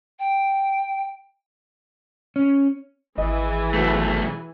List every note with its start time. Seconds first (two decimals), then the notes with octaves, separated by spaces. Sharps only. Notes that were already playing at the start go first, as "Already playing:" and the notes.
0.19 G5
2.36 C#4
3.18 G#1 E3 G#4 D#5 G#5
3.74 B1 A3 F#4 B4